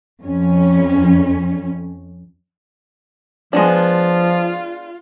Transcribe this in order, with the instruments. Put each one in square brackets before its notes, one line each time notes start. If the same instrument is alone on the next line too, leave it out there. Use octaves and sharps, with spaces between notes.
[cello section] F2 C#4
[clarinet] F3 [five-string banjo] G#3 B3 D4 [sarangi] F4